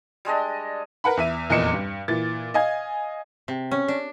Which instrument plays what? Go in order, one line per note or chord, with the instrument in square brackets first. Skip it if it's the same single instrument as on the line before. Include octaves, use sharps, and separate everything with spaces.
[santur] G3 G#3 D4 D#5
[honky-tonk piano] A#4 B4 F#5 B5
E2 E5 D#7
F1 E2 A#2 D#5 C#7 E7
G2
A#2 E3 A6
D#5 F5 G#5 G#6
[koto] C3
C#4
D4